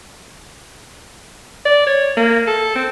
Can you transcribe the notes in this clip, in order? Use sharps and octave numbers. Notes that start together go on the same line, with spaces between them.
D5
C#5
A#3
A4
C4